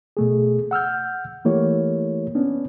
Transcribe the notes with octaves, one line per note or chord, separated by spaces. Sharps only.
B2 A3 G#4
F#5 E6 F6 G6
E3 A3 A#3 E4 G4 C#5
B3 C#4 D4